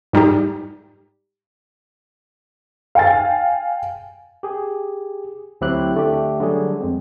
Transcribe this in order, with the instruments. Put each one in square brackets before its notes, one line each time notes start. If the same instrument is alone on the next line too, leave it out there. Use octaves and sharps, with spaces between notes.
[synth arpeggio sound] G#2 G3 D#4 G4
[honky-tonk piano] F5 G5 G#5 A6
[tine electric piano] G4 G#4
D2 F#3 C4 E4 G4 F#6
D3 A3 D4 G4
D3 F#3 G3 G#4
F2 G#3 C4